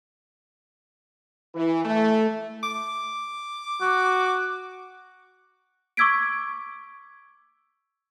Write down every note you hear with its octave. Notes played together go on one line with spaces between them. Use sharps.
E3
A3
D6
F#4
C#6 D6 E6 G#6 B6 D7